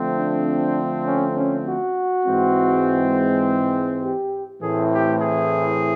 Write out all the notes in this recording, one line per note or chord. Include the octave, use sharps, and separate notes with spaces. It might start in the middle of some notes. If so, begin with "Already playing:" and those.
Already playing: D3 F3 A3 C4
D4
C#4
C#4
F#4
G#2 E3 G#3 C4
G4
A2 E3 A3 C4 G#4
G4
G#4